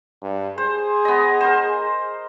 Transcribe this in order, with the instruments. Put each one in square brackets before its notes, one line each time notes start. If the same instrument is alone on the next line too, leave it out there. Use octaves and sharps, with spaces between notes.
[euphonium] G2
[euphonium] G#4 [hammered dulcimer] C5
[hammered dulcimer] B3 D#5
A#4 C5